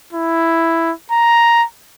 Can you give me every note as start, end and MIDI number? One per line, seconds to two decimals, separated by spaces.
0.13 0.92 64
1.11 1.64 82